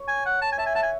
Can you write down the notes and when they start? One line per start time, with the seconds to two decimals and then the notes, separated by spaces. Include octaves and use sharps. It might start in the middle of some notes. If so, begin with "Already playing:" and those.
Already playing: C#5
0.08 G#5
0.26 F#5
0.42 A5
0.52 G#5
0.58 E5 A5
0.66 G#5
0.75 F#5 A5
0.83 G#5